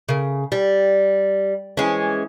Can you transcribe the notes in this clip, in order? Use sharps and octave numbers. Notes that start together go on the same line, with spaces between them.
C#3 A#4
G3
E3 G#3 C#4